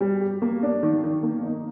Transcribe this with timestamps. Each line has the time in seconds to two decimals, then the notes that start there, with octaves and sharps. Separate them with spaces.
0.01 G3
0.21 G4
0.42 A#3
0.63 D4
0.83 D#3
1.03 D#3
1.23 A#3
1.43 D#4